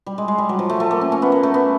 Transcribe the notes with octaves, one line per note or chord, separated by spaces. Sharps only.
G3
G#3
G#3
G3
F#3
F3
A3
A3
A#3
C#4
C#4
B3
A#3
A3
B3